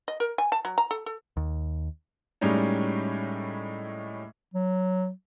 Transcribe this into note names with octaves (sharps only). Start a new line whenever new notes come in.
D#5
A#4
G#5
A5
F#3
A#5
A4
A4
D#2
A2 G3 G#3 C#4 D#4
F#3